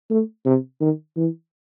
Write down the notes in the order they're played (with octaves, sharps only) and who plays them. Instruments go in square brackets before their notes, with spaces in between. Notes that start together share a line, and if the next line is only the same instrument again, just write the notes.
[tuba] A3
C3
D#3
E3